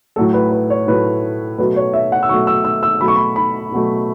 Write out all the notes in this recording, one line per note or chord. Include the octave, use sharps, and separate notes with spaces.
A2 F#3 A3 A4
B4
B4
C#5
A2 F#3 A3 B4
B2 F#3 A3 B4
C#5
E5
F#5
E6
B2 F#3 A3 C#6
E6
E6
E6
B2 F#3 A3 B5
C#6
B5
B5
B2 F#3 A3